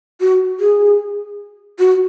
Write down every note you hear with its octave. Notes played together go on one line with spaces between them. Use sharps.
F#4
G#4
F#4